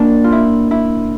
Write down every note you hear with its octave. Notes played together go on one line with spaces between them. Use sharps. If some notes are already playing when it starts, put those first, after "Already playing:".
Already playing: A#3 D4
F4
E4
E4